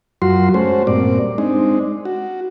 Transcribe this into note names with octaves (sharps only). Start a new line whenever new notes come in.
F#2 F#3 F4 F#4 C6
G#3 A3 C#4 F#4 C5
G2 A#2 C4 D5
G#3 C4 D4 D#4
F#4